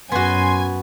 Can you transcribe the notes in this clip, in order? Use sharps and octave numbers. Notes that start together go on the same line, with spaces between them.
F#2 B3 F#4 G#5 C6